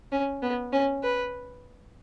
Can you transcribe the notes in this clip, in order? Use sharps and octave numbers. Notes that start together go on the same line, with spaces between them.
C#4
B3
C#4
B4